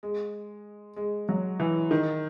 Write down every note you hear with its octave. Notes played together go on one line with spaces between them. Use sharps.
G#3
G#3
F#3
E3
D#3